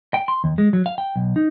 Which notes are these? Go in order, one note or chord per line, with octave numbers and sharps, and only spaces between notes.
G5
C6
D#2
G#3
F#3
F5
G5
B1
D#4